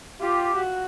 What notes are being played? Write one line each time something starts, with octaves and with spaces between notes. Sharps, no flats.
F4 G4
F#4